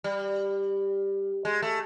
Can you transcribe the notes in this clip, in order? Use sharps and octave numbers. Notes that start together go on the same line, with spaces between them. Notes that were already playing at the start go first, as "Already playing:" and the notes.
G3
G#3
A3